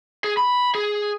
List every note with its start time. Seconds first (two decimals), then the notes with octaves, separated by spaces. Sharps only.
0.24 G#4
0.37 B5
0.75 G#4